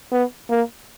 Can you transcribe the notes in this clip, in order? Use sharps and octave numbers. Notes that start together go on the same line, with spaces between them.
B3
A#3